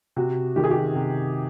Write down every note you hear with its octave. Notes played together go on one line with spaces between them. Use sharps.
C3 F#4
D#3 G4
G#4
G4
C3